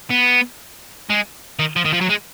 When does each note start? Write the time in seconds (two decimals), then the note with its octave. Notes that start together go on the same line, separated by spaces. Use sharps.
0.10 B3
1.10 G#3
1.59 D#3
1.76 F3
1.85 D#3
1.93 F3
2.01 F#3
2.09 G#3